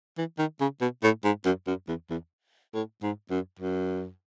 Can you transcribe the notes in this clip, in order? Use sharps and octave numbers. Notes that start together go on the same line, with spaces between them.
E3
D#3
C#3
B2
A2
G#2
F#2
F#2
E2
E2
A2
G#2
F#2
F#2